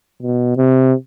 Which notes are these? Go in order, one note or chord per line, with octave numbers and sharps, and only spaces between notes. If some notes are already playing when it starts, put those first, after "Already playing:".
B2
C3